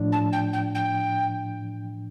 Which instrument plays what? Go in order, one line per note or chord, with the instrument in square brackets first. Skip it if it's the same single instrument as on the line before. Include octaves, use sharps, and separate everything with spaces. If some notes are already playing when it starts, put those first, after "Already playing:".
Already playing: [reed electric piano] A2 F3 D4
[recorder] A5
G5
G5
G5